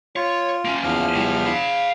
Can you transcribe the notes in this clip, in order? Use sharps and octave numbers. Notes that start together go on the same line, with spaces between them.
F4 C#5
A#3 C#4
E2 F3 F6
G3 E4
F5 B5